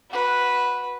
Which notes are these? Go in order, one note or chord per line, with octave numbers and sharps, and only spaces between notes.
F#4 B4